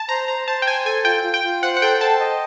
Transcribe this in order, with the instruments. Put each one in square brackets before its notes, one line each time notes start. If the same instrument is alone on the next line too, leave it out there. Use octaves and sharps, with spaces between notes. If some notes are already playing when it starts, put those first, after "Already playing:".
Already playing: [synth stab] A5
[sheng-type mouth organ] C5 [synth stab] A#5
[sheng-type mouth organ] C5 [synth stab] A#5
[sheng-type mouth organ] C5 [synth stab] A5
[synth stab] G5
[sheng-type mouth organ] C5 [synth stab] G#5
[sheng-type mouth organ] A4 [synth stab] G#5
[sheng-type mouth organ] F4 [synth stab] G5
[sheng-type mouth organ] F4
[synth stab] G5
[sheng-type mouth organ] F4
[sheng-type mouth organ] C5 [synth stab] F#5
[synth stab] F#5
[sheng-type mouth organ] A4 [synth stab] G5
[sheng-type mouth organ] C5 [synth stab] A5
[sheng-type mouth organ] D#5